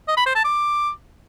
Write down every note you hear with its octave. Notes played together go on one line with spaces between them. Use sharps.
D#5
B5
C5
A5
D6